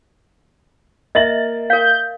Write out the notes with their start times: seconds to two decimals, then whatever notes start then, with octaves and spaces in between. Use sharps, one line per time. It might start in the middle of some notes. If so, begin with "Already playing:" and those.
1.15 A#3 D#5 E5 A6 F#7
1.70 A#4 F5 G6